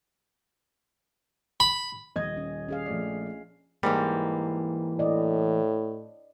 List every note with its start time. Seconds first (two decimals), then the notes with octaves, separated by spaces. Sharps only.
1.60 B5
2.16 D#1 D#5 G#6
2.37 C#4
2.69 C#4 G#4 F5
2.86 A#1 A3 D5
3.83 G#2 E3 G3 A#3
4.99 A2 D5 D#5